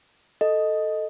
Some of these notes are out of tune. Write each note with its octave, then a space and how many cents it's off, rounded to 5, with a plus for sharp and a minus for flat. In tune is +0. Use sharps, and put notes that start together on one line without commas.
A4 +0 D#5 +0